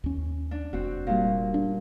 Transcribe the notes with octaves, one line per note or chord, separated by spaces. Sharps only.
D#2 C#4
D4
F1 C4 F#4
A#2 G3
D4